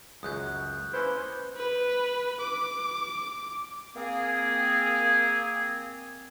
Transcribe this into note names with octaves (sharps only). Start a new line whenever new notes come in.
C#2 F#2 F#3 D#6 F#6 G6
A#3 C#4 E4 B4 C5
B4
D6
A#3 C4 G#4